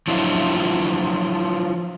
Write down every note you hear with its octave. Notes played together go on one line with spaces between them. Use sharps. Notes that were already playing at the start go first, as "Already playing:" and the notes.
F3 F#3 D4 E4 F4